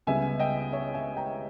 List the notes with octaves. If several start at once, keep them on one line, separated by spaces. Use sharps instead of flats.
C#2 C#3 G3 B3 E5 G#5
D#5 G5
C#5 E5
E5 G#5
G5 A#5